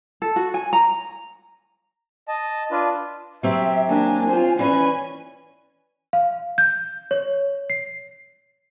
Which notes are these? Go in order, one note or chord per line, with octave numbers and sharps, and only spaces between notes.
A4
F#4
G#5
A#5
D#5 A5
D4 F4 B4
F#3 C4 G4 E5
A#3 D4 G#5
F4 C5
E3 C#4 B4 D5 G#5
F5
G6
C#5
C7